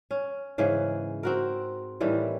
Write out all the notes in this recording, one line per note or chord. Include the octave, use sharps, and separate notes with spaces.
C#4
G#2 C#3 E3 G#4
C4 F#4 A#4
A2 D#3 E3 G3